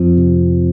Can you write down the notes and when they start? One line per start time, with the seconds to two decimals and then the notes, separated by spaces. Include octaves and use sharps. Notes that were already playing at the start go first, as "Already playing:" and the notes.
Already playing: F2 F3
0.17 C3